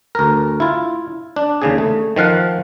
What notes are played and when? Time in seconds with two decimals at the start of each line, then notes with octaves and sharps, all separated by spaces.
0.15 D2 A#4
0.60 E4 F4
1.36 D4
1.62 D#2 C#3 G#4
1.78 A3
2.16 D#3 F3 F5 F#5